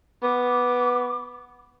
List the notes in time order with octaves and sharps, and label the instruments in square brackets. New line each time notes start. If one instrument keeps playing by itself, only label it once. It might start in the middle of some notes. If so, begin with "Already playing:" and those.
[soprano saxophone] B3 [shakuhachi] D6